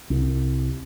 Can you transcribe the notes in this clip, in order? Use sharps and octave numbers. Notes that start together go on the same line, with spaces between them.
C2